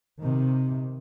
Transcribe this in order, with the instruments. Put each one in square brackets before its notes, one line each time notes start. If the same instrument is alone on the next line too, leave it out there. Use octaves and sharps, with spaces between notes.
[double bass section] C3 D#3